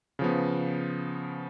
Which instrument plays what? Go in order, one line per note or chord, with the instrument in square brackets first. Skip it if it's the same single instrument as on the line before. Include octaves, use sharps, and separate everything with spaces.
[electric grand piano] C#3 F3 B3